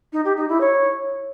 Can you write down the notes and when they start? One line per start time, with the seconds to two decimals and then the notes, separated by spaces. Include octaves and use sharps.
0.13 D#4
0.24 G4
0.36 D#4
0.48 E4
0.60 C#5